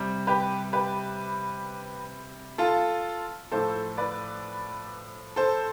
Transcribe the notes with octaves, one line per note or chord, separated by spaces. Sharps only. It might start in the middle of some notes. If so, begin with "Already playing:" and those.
Already playing: C3 G3
G4 B4
G4 B4
F4 A4
A2 F3 A3 A4 C5
B4 D5
A4 C5